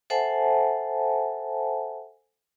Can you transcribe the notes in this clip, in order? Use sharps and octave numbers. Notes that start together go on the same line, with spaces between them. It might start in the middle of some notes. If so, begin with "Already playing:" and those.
A4 C5 E5 F#5 G#5 A5